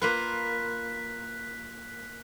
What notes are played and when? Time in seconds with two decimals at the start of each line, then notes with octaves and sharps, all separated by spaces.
0.02 A#3 F4 B4 F#6 B6